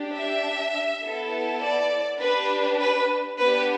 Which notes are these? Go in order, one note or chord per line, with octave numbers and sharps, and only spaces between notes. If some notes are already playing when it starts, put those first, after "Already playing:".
Already playing: D4 G4
E5
B3 E4 A4
D5
D4 G4 B4
B4
B3 D4 G4 B4